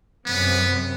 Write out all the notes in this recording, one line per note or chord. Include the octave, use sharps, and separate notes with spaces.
F#2 C3 B3